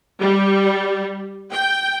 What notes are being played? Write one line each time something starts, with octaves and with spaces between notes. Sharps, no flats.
G3
G5